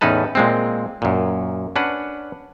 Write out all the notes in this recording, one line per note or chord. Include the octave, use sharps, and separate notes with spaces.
E2 A2 C#4 D#4 B4 A5
A#2 G#3 C4
F#2 A#2
C#4 D4 B4 F#5